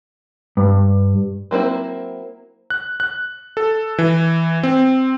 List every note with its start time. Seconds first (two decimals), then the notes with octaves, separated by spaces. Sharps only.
0.57 G2
1.51 F#3 A#3 C4 E4
2.70 F#6
3.00 F#6
3.57 A4
3.98 E3
4.63 C4